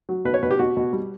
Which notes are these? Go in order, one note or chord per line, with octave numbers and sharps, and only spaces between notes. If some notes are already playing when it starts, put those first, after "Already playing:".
F#3
B2 B4
C#5
B2 B4
G4
B2 F#4
B2
G3